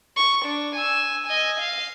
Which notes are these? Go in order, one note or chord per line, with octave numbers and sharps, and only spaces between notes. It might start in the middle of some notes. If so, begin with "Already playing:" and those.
C#6
D4
G#5 E6
D#5 G#5
F5